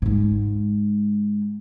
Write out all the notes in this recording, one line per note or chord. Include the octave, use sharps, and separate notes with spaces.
G#2 G#3